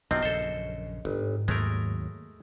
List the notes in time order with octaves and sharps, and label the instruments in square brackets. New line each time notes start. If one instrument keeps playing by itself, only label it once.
[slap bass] B1 F#2 [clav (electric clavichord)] C3 F3 C4 [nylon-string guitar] D#5
[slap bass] A#1 F#2 C#3 [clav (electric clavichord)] A4 C5
[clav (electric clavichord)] G1 [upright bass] G#2
[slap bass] D#2 F#3 [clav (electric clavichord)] G#3 A3 A#4